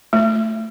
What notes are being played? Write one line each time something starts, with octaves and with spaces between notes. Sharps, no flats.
A3